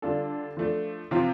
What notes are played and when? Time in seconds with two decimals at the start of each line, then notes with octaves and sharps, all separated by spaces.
0.02 D3 G3 D4 F4 A4
0.57 F3 A3 D4
1.11 C3 F3 C4 F4